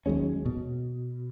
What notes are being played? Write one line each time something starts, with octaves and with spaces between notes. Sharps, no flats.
D#2 F#3 G#3 C#4
B2